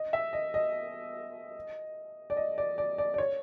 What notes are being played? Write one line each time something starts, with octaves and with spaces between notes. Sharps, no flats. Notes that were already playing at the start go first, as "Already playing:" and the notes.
Already playing: D#5
E5
D#5
D#5
D5
D#5
D5
D5
D5
D5
C#5